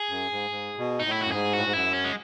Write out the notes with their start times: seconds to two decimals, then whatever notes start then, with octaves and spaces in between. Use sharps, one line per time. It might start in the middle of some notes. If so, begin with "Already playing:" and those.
Already playing: G#4
0.09 F#2
0.30 G#2
0.50 G#2
0.78 B2
1.00 D#4
1.05 A2
1.11 E4
1.21 F#2 F#4
1.32 G#2 G#4
1.53 A2 F#4
1.65 G#2
1.73 F#2 E4
1.93 C#4
2.04 G#3